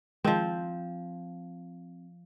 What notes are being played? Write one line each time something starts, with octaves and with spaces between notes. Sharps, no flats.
D#3 F3 G#3 C4